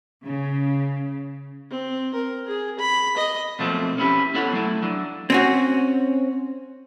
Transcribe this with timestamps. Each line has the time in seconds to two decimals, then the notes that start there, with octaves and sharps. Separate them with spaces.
0.24 C#3
1.70 C4
2.14 A#4
2.47 G#4
2.79 B5
3.17 D#5
3.59 B2 F3 F#3 A3 A#3 C4
3.98 C#4 E4 G4 B4
4.34 B3 E4 A4 C#5 F#5
4.53 F#3 A3 E4
4.82 F#3 D4
5.30 C4 C#4 F#4